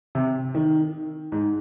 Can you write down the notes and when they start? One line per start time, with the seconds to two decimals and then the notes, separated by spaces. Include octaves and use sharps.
0.15 C3
0.55 D#3
1.32 G#2